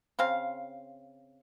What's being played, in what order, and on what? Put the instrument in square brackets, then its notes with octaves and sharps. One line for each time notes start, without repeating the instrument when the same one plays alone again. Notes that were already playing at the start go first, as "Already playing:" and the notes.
[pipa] C#3 C4 F5